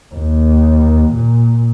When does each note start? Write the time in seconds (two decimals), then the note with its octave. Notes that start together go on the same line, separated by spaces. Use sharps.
0.15 D#2
1.13 A#2